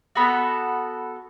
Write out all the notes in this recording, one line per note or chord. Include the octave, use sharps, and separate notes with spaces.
B3 F#4 A4 B5